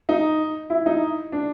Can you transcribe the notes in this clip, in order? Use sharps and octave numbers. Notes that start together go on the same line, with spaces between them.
D#4
E4
D#4
D4